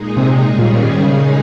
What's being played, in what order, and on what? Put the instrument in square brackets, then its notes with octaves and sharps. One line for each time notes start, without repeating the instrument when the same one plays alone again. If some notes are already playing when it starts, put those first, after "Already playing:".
Already playing: [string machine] A#2 G#3 D#4 G#4
[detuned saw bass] C3
[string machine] G#2 D#3 G3 C#4 G#4
[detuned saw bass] A#2
A#2
[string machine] A#2 G#3 D#4 G#4 [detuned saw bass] C#3